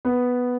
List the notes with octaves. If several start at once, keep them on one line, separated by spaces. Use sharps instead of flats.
B3